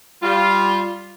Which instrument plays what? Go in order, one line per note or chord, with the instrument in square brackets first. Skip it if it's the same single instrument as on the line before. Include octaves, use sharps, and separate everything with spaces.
[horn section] G3 F4